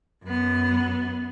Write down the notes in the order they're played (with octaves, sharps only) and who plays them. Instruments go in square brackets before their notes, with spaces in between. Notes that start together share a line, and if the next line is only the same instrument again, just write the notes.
[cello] F#2 B3